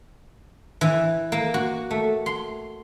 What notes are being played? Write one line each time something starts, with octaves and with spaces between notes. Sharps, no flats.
E3
A#3
F#4
A3
C6